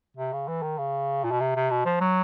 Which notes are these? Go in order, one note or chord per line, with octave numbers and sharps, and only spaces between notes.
C3
C#3
E3
D#3
C#3
A#2
B2
C3
C3
B2
F3
F#3